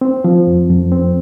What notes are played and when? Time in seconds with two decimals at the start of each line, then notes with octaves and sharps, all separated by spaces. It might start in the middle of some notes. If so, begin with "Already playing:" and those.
0.01 C4
0.24 F3
0.47 F2
0.70 F2
0.92 C4